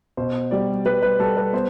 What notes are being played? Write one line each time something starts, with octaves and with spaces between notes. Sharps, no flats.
B2 C5
G3 D5
G3 B4
B4
G3 A4
B4
B3 C5